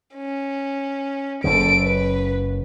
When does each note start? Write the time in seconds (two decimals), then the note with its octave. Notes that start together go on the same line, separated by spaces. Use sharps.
0.16 C#4
1.44 F#1 F#2 C#3 A4 D7
1.83 B4